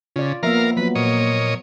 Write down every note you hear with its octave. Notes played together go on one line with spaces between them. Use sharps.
C#3 F4 D5
F3 A#3 B3 A#4 E5 F5
F3 F#3 B3 B4
A#2 C#5 D#5